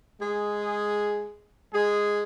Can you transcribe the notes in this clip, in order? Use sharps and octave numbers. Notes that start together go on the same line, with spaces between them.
G#3 G#4
G#3 G#4